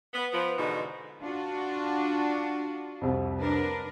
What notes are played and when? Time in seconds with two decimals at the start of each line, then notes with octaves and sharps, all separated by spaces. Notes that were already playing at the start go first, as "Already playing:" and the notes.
0.14 B3
0.32 F3 B3
0.57 G#2 B2 D3 E3 D#4
1.23 D4 F4 F#4
3.01 C2 F2
3.39 D4 A#4 B4